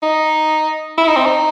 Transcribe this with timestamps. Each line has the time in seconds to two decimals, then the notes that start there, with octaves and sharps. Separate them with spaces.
0.03 D#4
0.98 E4
1.07 D#4
1.16 C4
1.26 D#4